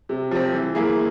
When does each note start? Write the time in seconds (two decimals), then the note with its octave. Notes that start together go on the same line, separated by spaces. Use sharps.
0.09 C3
0.31 F3 C4
0.53 E3
0.75 A#3 E4 G#4